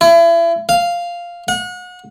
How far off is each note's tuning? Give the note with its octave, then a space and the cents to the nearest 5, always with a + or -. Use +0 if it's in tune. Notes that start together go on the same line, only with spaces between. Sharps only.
E4 +35
F5 -5
F#5 -35